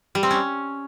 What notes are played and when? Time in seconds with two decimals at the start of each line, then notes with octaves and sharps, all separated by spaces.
0.15 G3
0.23 C4
0.31 C#4